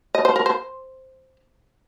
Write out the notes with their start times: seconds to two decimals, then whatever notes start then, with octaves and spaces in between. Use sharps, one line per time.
0.15 D#5
0.25 C5
0.36 A#4
0.46 C5